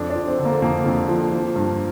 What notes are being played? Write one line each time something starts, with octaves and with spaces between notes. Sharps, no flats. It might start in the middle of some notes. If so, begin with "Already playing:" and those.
Already playing: F2 D4
D4
F3
C4
D3
A#3
F2 A#3
F2
F3
F3
G2